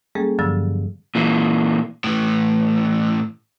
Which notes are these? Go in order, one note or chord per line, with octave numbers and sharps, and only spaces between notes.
G3 G#3 A#3 C#4 G#4 A4
G2 D3 F3 F#3 E6 A6
A#2 E3
A2 E3